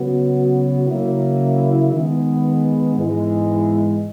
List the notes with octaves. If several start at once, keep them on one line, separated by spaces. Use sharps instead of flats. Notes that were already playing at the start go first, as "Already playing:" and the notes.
Already playing: C#3 F#3 B3 F#4
C#3 F#3 A#3 E4
D#3 G#3 B3
G#2 E3 G#3 B3